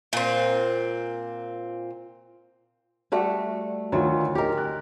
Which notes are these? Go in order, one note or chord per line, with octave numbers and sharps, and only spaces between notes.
A#2 C4
G3 A3 F#4
D2 D#3 F#3 F4
D2 D#4 G4 A#4
F#6